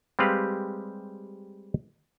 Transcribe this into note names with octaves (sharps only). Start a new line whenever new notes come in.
G3 G#3 C4 G4 B4 F5